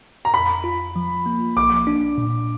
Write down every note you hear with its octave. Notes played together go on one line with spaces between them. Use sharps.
A#5
F2 B5
F4
F3
A#3
B1 D6
D4
A#2